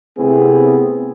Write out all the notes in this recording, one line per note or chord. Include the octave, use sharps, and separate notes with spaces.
C3 A3 B3 C4 E4 G#4